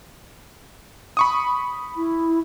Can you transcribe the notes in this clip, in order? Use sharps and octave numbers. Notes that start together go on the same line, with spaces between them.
B5 C#6 D#6
E4